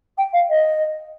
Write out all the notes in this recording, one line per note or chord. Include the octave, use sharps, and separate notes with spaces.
G5
F5
D#5